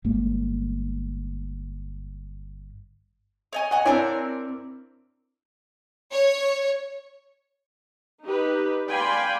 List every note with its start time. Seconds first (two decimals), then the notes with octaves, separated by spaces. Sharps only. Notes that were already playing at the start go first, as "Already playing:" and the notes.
0.04 G1 G#3 A#3
3.53 C#5 D#5 G#5
3.71 C#5 D#5 F#5 G#5
3.85 C4 D4 E4 A#4 C#5 D5
6.11 C#5
8.24 D#4 G4 B4
8.88 D5 F5 G5 G#5 B5 C6